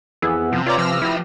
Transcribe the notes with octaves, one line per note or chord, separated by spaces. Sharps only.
F2 E3 B3 G#4 E6
C3 F3
F4 B4 C#5 D5 A#5 D6
F3 E6 F6 A#6
F3 E4 G4